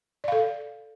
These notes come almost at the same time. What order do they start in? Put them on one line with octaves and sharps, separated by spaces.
D5 F5 A4